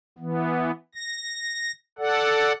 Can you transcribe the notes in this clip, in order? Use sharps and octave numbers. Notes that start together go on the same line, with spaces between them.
E3 B3
A#6
A4 D5 F#5